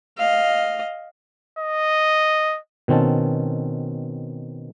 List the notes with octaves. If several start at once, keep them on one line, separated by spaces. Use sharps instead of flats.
D#5 F5
D#5
B2 D#3 C4 C#4 A5